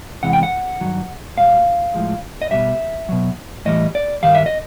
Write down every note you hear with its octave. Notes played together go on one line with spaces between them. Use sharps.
E2 C3 E3 G#3 F#5
G5
F#5
G2 D#3 F#3
A#2 G3 F5
A2 F3 G#3
D#5
B2 G3 E5
B2 F#3
A2 E3 G3 D#5
D5
G2 D#3 G3 F5
E5
D#5